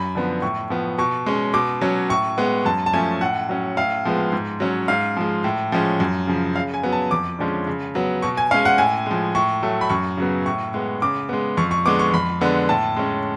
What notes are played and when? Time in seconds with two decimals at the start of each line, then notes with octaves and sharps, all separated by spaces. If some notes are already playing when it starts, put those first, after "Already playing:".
Already playing: F#2 B5
0.15 D3 F3 B3
0.42 A2 C#6
0.70 F3 B3
0.98 B2 C#6
1.26 G#3 C#4
1.54 B2 D6
1.81 F#3 C#4
2.09 A2 C#6
2.38 G#3 B3
2.65 F#2 A5
2.86 A5
2.93 F3 A3 C#4 G#5
3.21 A2 F#5
3.49 F#3 C#4
3.77 A2 F5
4.05 F3 G#3 B3
4.32 G#2
4.60 F#3 C#4
4.88 G#2 F5
5.17 F3 G#3
5.44 A2
5.72 F3 G#3 C#4
6.00 F#2
6.27 C#3 F3
6.56 C#3 F5
6.74 G#5
6.83 F#3 B3
6.92 A5
7.11 F2 D6
7.39 D3 F3 G#3 C#4
7.67 C#3
7.95 F#3 B3
8.22 B2 C#6
8.37 G#5
8.51 C#4 F5
8.54 G#3
8.65 F#5
8.78 A2 G#5
9.06 F3 G#3
9.35 A2 C#6
9.62 F#3 A3
9.81 B5
9.90 F#2 C#6
10.17 C#3 F#3 B3
10.46 A2 C#6
10.74 G#3 B3
11.02 C#3 D6
11.29 G#3 B3
11.57 F2 C#6
11.71 C#6
11.86 D3 G#3 B3 D6
11.99 C#6
12.13 F2 B5
12.41 D3 G#3 B3
12.69 A2 A5
12.96 G#3 C#4